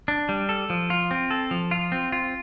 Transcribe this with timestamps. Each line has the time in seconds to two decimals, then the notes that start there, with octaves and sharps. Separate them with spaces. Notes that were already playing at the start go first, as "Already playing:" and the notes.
0.08 D4
0.29 G3
0.49 A4
0.70 F3
0.90 F4
1.11 C4
1.30 A4
1.51 F3
1.71 F4
1.92 C4
2.12 F4